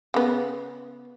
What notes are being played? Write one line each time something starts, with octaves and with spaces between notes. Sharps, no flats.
C#3 B3